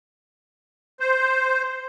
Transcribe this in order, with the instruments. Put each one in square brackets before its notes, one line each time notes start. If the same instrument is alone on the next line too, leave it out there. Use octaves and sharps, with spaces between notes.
[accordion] C5